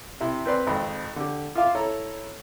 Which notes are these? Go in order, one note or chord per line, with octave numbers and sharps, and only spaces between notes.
C3 E4
C4 B4 D5 C6
G#1 F2 D#5 G5 B5
D3 G4
F4 E5 F5 D6
E4 A4 C#5 A#5